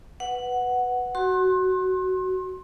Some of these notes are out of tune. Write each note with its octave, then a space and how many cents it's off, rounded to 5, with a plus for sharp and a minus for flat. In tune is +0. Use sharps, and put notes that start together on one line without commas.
B4 +5 F#5 +0
F#4 +15 C6 +30